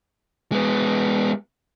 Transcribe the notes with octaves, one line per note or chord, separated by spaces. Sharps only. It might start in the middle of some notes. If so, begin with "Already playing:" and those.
G#3 B3